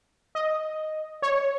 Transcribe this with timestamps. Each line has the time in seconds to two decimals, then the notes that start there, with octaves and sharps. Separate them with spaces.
0.35 D#5
1.22 C#5